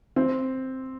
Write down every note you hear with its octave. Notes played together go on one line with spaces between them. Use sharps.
C4